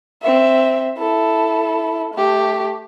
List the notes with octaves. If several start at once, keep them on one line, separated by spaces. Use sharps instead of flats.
C4 E5
E4 A4
A3 G4